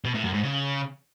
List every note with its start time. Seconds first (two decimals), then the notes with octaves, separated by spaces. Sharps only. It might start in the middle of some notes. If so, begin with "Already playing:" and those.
0.05 B2
0.14 A2
0.24 F#2
0.34 G#2
0.43 C#3